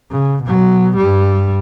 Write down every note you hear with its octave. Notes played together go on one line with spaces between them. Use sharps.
C#3
B2 F#3
G2 G3